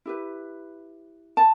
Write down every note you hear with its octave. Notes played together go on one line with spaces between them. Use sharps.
E4 G4 B4
A5